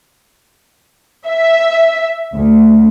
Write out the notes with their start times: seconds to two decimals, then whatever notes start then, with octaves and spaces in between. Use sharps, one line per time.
1.27 E5
2.34 D2